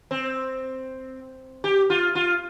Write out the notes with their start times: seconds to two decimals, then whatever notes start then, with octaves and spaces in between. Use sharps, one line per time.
0.11 C4
1.64 G4
1.90 F4
2.15 F4